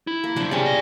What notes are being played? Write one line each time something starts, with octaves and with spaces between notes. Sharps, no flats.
E4
A#3
C#2 F#2 D4 C5
C3 G3 C#4 G#4 D5 G#5
D#5